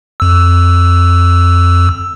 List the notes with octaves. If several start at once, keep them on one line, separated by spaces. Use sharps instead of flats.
F2 E6